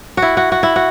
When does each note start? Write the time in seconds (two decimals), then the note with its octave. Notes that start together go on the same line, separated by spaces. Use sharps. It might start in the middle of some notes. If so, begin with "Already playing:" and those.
0.17 E4 F#4
0.37 F#4
0.52 F#4
0.63 E4
0.76 F#4